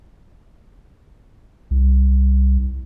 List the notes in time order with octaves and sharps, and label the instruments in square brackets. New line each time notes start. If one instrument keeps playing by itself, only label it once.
[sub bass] C2